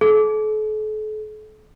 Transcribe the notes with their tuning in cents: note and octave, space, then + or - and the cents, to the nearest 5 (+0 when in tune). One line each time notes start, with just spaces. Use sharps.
A4 -40